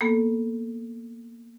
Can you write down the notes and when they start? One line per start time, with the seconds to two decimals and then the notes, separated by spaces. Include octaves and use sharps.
0.01 A#3 B3 A4